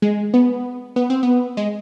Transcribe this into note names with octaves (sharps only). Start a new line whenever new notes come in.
G#3
B3
B3
C4
B3
G#3